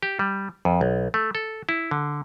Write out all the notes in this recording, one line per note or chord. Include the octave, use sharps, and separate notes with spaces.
G4
G3
F2
B1
A3
A4
E4
D3